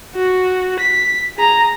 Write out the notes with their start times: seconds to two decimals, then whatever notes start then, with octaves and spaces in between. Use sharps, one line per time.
0.15 F#4
0.79 B6
1.37 G#4 A#5